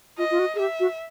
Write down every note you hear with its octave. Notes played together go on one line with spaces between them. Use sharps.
F4 D#5
F4
F#4
G#4
G4 E5
F#4